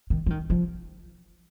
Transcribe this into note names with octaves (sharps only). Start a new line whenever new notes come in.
D#3
F3
D#3
F3